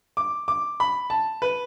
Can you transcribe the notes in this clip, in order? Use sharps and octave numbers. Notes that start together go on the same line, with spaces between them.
D6
D6
B5
A5
B4